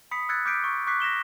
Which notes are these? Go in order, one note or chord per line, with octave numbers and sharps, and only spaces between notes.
B5 D#6 B6 C#7
E6 F#6 G#6 A6 C#7
D6 F6 G6 B6 C#7 D7
C#6
C#6 D6 F#6 B6 C7
A#6 B6 E7 G7